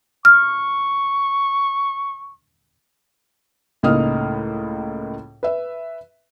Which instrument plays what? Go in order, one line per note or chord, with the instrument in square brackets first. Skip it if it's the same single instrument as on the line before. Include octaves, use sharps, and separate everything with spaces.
[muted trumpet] C#6 [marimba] F6
[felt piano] C#2 A2 A#3 D#4 D#6 F6
B4 E5